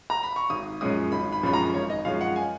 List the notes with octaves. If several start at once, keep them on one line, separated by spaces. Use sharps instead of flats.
A#5
B5
C#6
G#1 D#6
F#2 F3 G#3 C#4 D#6
G#1 B5
B5
F#2 F3 G#3 C#4 B5
A#5
G#1 C#5
D#5
F#2 F3 G#3 C#4 F5
F#5
G#5